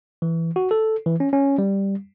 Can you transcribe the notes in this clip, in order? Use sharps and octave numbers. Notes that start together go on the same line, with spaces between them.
E3
F#4
A4
E3
C#4
C#4
G3